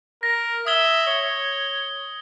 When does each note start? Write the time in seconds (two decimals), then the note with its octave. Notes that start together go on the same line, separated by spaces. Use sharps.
0.23 A#4 A#6
0.67 E5 D#6 G#6 G7
1.07 C#5 G7